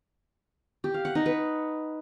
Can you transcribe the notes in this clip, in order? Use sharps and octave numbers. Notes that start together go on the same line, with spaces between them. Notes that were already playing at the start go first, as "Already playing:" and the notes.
G4
F5
F#5
D#4
B4